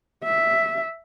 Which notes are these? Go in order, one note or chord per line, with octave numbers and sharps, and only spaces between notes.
E5